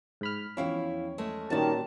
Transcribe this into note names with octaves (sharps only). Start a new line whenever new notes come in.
G#2 B5 F6
E2 F3 C#4 E4 F5 G5
G#3 A3
A#2 D#3 G3 C#4 F#4 G4 A5